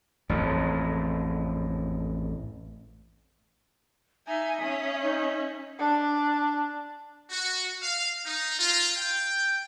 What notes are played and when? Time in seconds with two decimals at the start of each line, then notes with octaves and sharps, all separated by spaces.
0.29 A1 F2 G#2
4.27 D#4 E5 G#5
4.62 C#4 D#6
5.02 D#4 E5
5.79 D4
7.30 F#4
7.83 F5
8.26 D#4
8.59 F4
8.96 G5